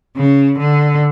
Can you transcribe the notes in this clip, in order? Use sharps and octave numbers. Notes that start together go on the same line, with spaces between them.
C#3
D3